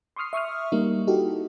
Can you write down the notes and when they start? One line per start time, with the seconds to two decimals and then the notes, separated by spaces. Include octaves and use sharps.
0.16 C6 C#6 D#6 F6 C7
0.33 E5 C#6 D#6 F6
0.72 G3 A#3 D#4
1.07 D#4 E4 F#4 G4 A4